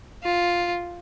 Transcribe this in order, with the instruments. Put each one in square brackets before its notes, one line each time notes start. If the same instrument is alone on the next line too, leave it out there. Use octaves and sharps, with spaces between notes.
[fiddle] F4